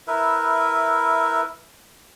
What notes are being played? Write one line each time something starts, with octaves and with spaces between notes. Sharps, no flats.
E4 A#4 B4 E5